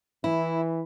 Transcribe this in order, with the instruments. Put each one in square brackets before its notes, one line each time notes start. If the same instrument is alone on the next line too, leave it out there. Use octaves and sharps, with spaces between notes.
[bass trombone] E3 [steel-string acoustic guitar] E4